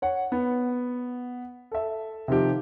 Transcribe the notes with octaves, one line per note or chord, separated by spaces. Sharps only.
C#5 F#5
B3
A4 E5
C3 D#3 F3 G4